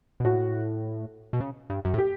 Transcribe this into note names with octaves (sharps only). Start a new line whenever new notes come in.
B2
A2 F#4
B2
C#3
G2
F#2
A2
G4